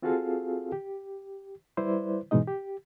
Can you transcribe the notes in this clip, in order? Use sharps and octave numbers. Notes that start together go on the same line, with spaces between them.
C4 F4 F#4 G#4 A4 F5
G4
G3 E4 B4 C5 D5
G#2 B2 E3 G#3 D#4 D#5
G4